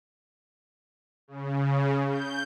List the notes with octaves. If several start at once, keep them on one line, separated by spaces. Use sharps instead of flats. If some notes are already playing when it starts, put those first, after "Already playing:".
C#3
G6